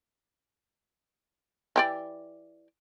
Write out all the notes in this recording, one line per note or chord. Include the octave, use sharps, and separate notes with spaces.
E3 G4 D5